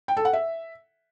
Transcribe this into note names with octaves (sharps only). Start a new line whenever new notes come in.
G5
A4
F#5
E5